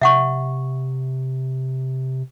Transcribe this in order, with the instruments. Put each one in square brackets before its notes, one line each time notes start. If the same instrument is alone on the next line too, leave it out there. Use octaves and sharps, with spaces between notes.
[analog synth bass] C3 [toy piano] E5 F#5 C#6